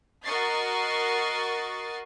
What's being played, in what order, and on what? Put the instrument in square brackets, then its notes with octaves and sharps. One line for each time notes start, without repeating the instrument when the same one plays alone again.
[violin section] F#4 A#4 D#5 C#6 A6 C7